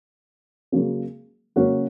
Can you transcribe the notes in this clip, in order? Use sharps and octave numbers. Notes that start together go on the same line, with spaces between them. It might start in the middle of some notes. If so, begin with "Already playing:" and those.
C#3 F#3 A#3 C#4
C#3 F#3 A#3 C#4 F#4